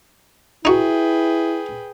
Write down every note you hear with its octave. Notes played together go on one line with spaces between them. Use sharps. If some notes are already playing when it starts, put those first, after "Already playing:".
D#4 E4 F#4 G#4 B4 G5